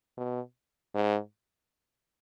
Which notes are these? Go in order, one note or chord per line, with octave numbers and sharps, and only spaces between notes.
B2
G#2